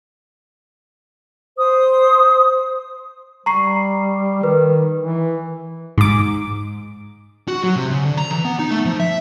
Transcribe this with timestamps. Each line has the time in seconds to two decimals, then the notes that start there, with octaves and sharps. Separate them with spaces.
1.57 C5 D#6
3.46 G3 A#5 C#6 C7
4.43 D#3 B4
5.01 E3
5.98 G#2 D6
7.48 F#4
7.64 F#3
7.76 C3
7.91 C#3
8.05 D3
8.17 A#5
8.31 E3
8.44 B3
8.59 D#4
8.71 A3
8.86 F3
9.00 E5